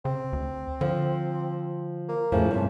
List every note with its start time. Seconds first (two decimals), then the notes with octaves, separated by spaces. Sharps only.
0.05 C#3 C4
0.33 D2
0.81 D3 F3
2.08 A#3
2.32 F2 A2 C#3 F3
2.51 G2 C3 C#4